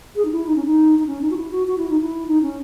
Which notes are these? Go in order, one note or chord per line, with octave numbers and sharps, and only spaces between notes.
G#4
D#4
E4
D#4
C#4
D#4
D#4
C#4
D#4
F#4
E4
F#4
F#4
E4
D#4
E4
D#4
C#4